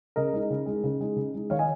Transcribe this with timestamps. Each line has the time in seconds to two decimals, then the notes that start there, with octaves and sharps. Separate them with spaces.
0.16 C#3 A#4 D#5
0.33 G#3 D#4
0.50 C#3
0.66 G#3 D#4
0.84 C#3
1.01 G#3 D#4
1.16 C#3
1.34 G#3 D#4
1.50 D#3 C#5 F5
1.59 D#5 G#5